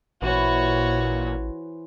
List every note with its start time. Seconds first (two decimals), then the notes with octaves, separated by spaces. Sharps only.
0.22 A1 A#2 E3 F#4 C5 C#5